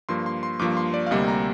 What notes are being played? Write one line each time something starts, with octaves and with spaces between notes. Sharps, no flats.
G2 F3 A#3 C6
C6
C6
G2 F3 A#3 D6
C6
D5
F5
D2 C3 G3 A#3 D#5
A#5